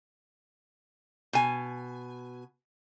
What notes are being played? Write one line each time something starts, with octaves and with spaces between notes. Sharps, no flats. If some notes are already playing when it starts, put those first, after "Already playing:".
B2 G#5